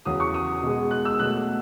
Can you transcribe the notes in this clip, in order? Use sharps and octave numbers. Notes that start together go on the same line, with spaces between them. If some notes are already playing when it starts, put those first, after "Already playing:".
E2 C#3 F#3 D#6
C#6
D#6
B2 G#3
F#6
E6
B2 F#3 A3 F#6